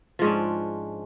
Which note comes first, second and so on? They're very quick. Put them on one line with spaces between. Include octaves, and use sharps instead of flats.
F3 G#2 C#4 D4